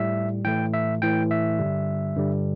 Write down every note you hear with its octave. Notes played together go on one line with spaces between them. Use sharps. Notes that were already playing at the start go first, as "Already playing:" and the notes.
Already playing: A2 G3 E5
A2 E3 A3 G5
E5
A2 E3 A3 G5
E5
G2 D3 G3
G2 D3 G3